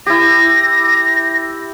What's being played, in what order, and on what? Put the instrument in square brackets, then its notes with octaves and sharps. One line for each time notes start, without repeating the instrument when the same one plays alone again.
[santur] E4 G4 [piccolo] A#6